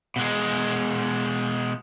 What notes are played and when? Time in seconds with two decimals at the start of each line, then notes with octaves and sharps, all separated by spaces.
0.16 B2 G#3